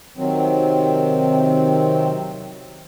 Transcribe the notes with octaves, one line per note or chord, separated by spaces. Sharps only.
C3 D#3 F#3 C4